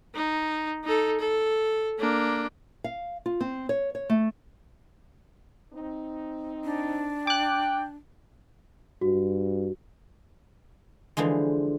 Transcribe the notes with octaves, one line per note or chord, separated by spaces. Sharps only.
D#4
D#4 A4
A4
A#3 D4
F5
F4
C4
C#5
C#5
A3
C4 D#4
D4
G5 D6 F#6
G2 F#4
D3 E3 F3 G#3